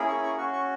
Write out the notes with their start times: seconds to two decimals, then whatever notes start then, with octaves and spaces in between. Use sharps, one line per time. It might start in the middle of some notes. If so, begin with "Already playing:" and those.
Already playing: A#3 C#4 E4 G#4
0.08 C#6
0.23 C#6
0.37 C#4 F#4 C#6
0.53 C#6